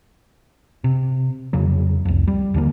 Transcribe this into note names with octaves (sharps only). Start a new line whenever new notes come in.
C3
F2 C#3 F#3
C2 F2
G3
D#2 D3 A#3